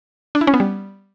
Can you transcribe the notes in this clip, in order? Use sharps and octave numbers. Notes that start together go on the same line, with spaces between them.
D4
E4
C#4
B3
G3